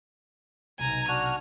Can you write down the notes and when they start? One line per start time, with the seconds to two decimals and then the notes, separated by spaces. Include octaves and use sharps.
0.79 B1 C3 G#5 A#5
1.08 D4 F#4 F#5 F6